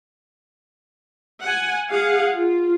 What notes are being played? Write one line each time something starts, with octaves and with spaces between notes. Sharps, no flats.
F#5 G#5
G#4 F5 F#5
F4